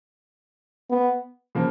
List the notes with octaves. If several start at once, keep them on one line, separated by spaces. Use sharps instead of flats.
B3
C#3 F3 A#3